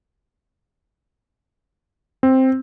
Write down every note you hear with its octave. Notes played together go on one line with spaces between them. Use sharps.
C4